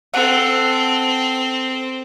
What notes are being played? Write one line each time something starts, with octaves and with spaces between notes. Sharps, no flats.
C4 A4 F#5